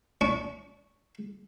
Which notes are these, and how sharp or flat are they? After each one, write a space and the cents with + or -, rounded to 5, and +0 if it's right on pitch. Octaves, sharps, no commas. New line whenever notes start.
D4 -40 C#6 +0